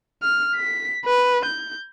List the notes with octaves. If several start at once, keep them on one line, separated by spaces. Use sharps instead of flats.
F6
B6
B4
G6